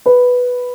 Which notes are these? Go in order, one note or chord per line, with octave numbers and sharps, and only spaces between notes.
B4